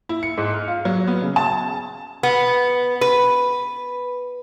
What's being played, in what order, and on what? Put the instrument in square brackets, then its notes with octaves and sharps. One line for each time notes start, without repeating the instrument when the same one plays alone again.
[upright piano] E4
C#7
G#2
F6
F4
F#3
B3
C#3
A5
[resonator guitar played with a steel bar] B3
B4